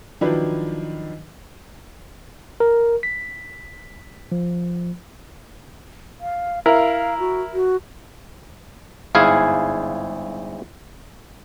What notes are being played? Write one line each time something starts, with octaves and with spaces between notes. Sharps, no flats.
D#3 F3 F#3 D4 E4 B4
A#4
B6
F3
F5
E4 A#4 F5
F#4
F#4
G1 G#2 E4 G#4 F5 G#5